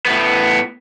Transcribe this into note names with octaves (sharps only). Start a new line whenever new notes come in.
A2 B3